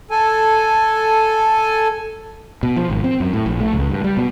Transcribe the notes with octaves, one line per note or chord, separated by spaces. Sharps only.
A4 G#5
B2
F3
G#1
C4
F#2
A2
A#1
A3
C#2
G2
G3
B2